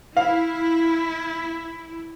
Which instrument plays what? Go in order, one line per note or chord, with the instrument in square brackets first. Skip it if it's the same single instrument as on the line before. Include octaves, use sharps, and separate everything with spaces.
[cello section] E4 [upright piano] F5